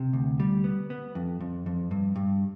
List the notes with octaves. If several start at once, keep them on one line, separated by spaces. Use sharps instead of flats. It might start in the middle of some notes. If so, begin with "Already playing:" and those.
Already playing: C3
D2
G3
B3
B3
F2
F2
F2
G2
G2